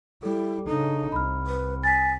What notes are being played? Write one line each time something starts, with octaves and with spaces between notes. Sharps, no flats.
G3 E4 A4
C#3 D4 D#4 A4
C2 B5 F6
B4
G#5 A6 B6